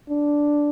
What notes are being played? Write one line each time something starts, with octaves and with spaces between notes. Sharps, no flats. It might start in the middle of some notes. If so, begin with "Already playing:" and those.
D4